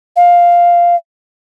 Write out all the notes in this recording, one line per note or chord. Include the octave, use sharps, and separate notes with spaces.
F5